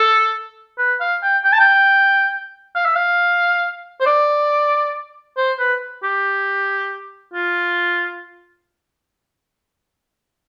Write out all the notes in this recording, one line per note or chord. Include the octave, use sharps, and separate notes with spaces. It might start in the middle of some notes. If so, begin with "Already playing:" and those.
Already playing: A4
B4
F5
G5
G5
A5
G5
F5
E5
F5
C5
D5
C5
B4
G4
F4